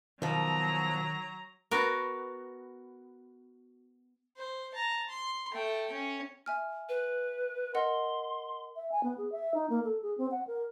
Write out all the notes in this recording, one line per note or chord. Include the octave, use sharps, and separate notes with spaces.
B2 D#3 F3 F#3 A#5
B3 F#4 A#4
C5
A5 A#5
C6
A3 G5
C#4
E5 G#5 F6
B4
A#4 D#5 F#5 C6
E5
G#5
B3
G#4
E5
D#4
A#3
A4
G#4
C4
F#5
A#4